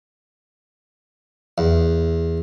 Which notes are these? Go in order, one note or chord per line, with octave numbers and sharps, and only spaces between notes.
E2